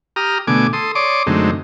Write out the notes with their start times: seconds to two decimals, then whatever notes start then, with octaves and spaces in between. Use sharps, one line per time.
0.16 G4 A#5 D#6 F6
0.47 B2 D3 A3 G#5 D6
0.73 A4 C6 D#6
0.95 C#5 D5 C6 D6 D#6
1.27 F#2 D3 G#3 A3 C4 D#4